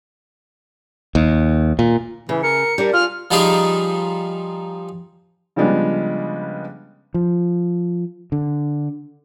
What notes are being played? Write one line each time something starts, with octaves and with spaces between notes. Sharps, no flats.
D#2
A#2
C#3 E3
A#4 C#7
G3 D4 A#4
F4 G#4 F6
F3 G3 D#4 F4 G4 G#4
C#3 F3 G3 G#3 B3 D4
F3
D3